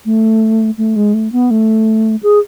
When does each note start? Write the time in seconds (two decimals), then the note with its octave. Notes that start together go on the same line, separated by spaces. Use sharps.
0.05 A3
0.78 A3
0.96 G#3
1.14 A3
1.32 B3
1.51 A3
2.23 G#4